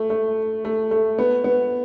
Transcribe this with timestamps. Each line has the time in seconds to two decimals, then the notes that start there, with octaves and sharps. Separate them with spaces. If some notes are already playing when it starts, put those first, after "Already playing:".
Already playing: A3
0.10 A3
0.65 A3
0.91 A3
1.19 B3
1.44 B3